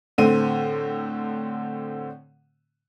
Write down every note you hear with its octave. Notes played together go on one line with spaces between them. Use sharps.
A2 D3 C4 D#7